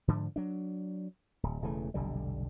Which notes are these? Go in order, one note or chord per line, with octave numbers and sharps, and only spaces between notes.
G#2 D3 F3
F#3 D4
D1
E1 C#3 E3 A3
F1 B1 D3 G3